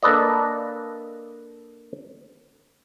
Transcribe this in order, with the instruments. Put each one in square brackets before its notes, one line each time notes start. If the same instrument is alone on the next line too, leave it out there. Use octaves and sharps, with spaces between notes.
[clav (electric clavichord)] A#3 D4 A4 B4 D5 D#5